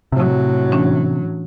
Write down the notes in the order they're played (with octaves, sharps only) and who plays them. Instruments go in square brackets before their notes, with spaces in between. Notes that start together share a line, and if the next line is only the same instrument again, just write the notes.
[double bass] A2 F#3 [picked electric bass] C3
[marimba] E3 C#4 D4